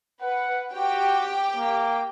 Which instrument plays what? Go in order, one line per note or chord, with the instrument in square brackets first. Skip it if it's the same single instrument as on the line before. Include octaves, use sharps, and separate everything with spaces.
[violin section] B4 [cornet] F#5
[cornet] F#4 [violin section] G4 G5
[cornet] A#3